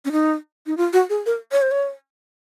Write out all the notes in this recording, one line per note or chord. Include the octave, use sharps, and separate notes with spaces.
C#4
D#4
D#4
F4
F#4
G#4
A#4
C#5
C5
C#5